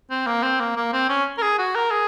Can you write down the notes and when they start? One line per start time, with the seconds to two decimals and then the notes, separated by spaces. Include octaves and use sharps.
0.11 C4
0.27 A#3
0.43 C4
0.60 A#3
0.76 A#3
0.93 C4
1.09 C#4
1.38 A#4
1.42 G#4
1.59 F#4
1.75 A#4
1.91 G#4